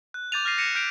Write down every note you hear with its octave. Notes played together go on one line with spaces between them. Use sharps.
F#6
D6 G6 A6 D#7 F7
F6 A6 A#6 C7 D#7
A#6 C#7 D#7 E7
F6 G6 B6 D7 F7